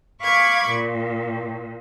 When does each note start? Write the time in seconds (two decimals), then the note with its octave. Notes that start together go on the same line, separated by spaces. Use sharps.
0.22 F5 B5 C#6 D6 G#6
0.68 A#2